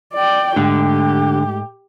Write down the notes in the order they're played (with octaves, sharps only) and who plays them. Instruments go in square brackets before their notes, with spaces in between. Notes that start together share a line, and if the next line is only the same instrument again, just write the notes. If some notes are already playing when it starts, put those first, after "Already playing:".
[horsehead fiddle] D5 G5
[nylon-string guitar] G#2 A3 [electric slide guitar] D3 [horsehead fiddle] G4